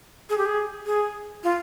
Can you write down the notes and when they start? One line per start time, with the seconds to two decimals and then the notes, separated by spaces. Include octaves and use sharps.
0.30 G#4
0.38 G4
0.46 G#4
0.86 G#4
1.43 F4